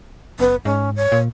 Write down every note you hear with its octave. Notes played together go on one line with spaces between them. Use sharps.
F#1 B3
G#2 C#4
C#5
A#2